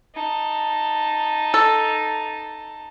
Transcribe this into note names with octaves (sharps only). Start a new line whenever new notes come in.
D#4 A5
A4